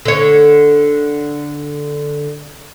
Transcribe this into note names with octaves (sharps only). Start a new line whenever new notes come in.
D3 C#5